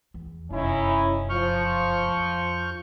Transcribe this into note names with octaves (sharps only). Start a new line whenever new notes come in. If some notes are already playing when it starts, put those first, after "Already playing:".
E2
F1 F#2 C#4 D#4 E4
F3 C#6 F6 G6
F2